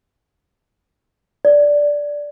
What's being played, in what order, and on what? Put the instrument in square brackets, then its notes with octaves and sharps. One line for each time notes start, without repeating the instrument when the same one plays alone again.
[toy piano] D5